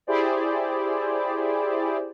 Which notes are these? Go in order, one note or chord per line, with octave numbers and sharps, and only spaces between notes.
E4 G4 G#4 C5 D5